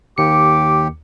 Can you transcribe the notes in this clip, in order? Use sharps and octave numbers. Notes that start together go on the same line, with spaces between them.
D#2 G4 D6 C#7